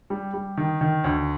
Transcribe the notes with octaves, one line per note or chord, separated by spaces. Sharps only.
G3
G3
D#3
D#3
D2